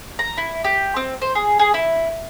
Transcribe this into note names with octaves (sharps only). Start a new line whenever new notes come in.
A#5
E4
G4
C4
C5
G#4
G#4
E4